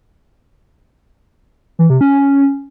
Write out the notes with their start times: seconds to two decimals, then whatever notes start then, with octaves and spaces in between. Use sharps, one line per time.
1.79 E3
1.90 C3
2.01 C#4